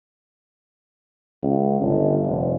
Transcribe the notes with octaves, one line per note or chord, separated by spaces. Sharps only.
C#2
G1
F1